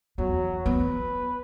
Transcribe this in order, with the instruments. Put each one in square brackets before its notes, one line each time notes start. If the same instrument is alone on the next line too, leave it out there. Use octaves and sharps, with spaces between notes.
[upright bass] E2 [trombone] F#3
[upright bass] B3 [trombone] B4